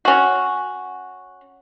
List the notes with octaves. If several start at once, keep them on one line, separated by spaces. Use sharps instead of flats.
C#4 F#4